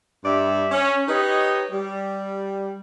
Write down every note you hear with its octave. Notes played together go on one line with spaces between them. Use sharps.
G2 G3 D5 E5
C#4
D#4 G4 B4 C#5 D#5
G3